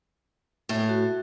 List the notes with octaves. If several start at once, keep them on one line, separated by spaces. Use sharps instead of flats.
A2
F#4